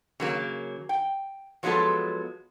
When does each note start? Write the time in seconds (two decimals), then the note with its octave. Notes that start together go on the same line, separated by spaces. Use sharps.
0.20 C#3 F#3 A#3
0.89 G5
1.63 F3 F#3 G#3 B3 F4 A4